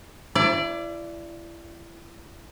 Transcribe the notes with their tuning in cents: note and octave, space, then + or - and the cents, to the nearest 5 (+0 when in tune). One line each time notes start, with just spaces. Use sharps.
E4 +35 D5 +0